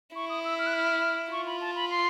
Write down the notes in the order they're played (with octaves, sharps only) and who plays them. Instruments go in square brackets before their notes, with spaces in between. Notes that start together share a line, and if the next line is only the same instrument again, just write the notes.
[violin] E4 [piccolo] C#6
[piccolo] D#6
E6
F6
F#6
F6
[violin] F4 [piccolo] C#6
[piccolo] B5
A5
B5
C6